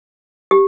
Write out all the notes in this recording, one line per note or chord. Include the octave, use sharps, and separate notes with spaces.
G4